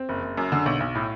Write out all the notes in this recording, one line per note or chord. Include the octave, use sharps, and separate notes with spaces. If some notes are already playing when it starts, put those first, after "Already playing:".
Already playing: C4
F#1
F#1
F#2
D3
B1
B1
A2